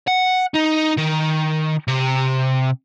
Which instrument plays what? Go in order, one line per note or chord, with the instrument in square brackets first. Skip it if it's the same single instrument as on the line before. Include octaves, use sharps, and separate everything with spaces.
[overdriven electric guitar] F#5
D#4
D#3
C3